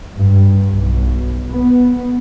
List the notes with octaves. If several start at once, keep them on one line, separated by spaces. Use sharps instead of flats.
G2
B1
B3